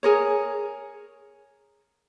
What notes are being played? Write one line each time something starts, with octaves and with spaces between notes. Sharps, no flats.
G#4 A#4 C#5